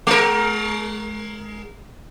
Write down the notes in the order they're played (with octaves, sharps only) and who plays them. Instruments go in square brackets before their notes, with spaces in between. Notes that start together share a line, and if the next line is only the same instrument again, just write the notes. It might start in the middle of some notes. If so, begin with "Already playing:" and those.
[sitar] G#3 A#4